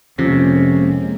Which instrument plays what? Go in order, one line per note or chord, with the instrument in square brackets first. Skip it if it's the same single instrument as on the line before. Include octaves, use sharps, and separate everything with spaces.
[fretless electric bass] F2 F3 [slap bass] C3 [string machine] G#3 A#3 C4 [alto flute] C#4